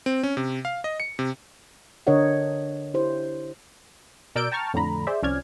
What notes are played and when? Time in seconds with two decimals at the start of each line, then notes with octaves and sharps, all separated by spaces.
0.06 C4
0.23 C#4
0.37 C3
0.65 F5
0.84 D#5
1.00 C#7
1.19 C3
2.07 D3 D4 A#4 C#5 D#5 F#5
2.94 E4 G4 C5
4.35 B2 A#4 D5 E6 G6 D7
4.52 G5 A5 A#5 C#6 F6 A6
4.74 F2 A2 D3 A#5 B5
5.07 G#4 C5 D5 E5
5.22 C2 F3 C#4 D5 F6 G#6